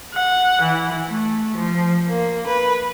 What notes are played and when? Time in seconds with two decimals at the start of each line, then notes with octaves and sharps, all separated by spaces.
0.15 F#5
0.62 E3
1.08 A3
1.57 F3
2.09 A#3
2.47 B4